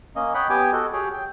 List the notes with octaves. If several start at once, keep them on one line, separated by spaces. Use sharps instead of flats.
A#3 C#4 D#5
C#5 D#5 F#5 G5 B5
B3 G4 G5 G#5 D6
F#4 A4 D#5
G4 G#4 C#5 G5
G5